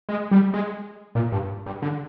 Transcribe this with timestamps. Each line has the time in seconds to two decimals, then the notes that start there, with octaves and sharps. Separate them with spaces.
0.09 G#3
0.31 G3
0.54 G#3
1.15 A#2
1.32 G2
1.66 G2
1.82 D3